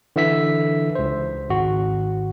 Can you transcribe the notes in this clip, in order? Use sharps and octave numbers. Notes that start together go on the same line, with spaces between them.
D3 E3 E5 E6 B6
C#2 C5
G#1 F#4